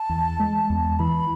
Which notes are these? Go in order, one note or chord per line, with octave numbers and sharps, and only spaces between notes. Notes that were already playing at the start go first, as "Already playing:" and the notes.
Already playing: A5
E2
G#3
E2
E3 B5